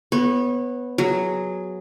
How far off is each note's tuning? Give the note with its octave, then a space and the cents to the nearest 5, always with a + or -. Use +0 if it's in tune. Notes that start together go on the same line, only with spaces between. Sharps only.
B3 +0 C#5 -25
F#3 +0 G#4 +0